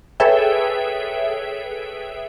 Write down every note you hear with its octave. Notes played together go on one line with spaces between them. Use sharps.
G#4 A4 B4 C#5 E5 G5